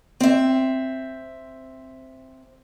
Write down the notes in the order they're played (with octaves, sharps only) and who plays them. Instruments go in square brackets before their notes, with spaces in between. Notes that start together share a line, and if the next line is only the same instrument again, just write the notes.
[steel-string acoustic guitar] C4 E5